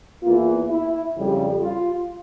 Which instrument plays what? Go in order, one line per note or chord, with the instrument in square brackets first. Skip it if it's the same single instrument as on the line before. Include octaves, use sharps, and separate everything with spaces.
[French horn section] E2 E3 A#3 F4
E4
F2 C#3 G3
F4